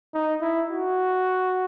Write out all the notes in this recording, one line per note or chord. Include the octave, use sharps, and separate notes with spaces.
D#4
E4
F#4